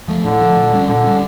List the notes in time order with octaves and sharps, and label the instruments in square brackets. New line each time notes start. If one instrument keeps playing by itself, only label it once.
[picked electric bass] F3 A3
[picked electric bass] A2 [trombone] D3
[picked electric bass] F3 A3
A#2
G3 C#4
[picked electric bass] A#2 [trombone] D3
[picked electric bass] G3 C#4